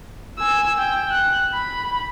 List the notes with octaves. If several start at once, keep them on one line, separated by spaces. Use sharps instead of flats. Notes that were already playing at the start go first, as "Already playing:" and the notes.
G#5 E6
G5
F#6
B5